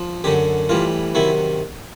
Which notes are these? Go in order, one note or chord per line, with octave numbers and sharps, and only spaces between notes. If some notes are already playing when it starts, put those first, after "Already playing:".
Already playing: F3
F#2 D3 F#3 G4
A2 E3 G3 F4
C3 D#3 F#3 E4